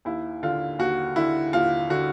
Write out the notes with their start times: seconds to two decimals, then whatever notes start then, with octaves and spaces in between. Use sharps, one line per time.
0.05 D#2 E4
0.43 D3 F4
0.79 D#2 F#4
1.16 D3 E4
1.53 D#2 F4
1.90 D3 F#4